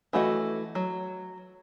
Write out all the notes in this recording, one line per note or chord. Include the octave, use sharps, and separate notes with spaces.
E3 A3 F#4 D#5
F#3